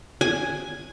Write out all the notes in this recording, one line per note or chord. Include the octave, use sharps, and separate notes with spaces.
G#5